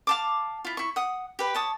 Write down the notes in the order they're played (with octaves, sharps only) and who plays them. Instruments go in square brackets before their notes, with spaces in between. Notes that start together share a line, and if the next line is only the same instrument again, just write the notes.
[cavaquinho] F5 A5 D6
E4 F4
E4 C#6
F#5 D#6
G4 B4
C#5 A5 D#6